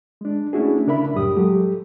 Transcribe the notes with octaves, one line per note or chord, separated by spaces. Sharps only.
G#3 D4
A3 C#4 D4 E4 F#4 G#4
C#3 D4 A#4 E5 B5
C2 F#2 A2 G3 G4 D#6
F#3 G#3 G4 A4